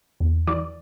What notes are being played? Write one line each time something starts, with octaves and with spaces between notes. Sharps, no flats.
E2
E3 D5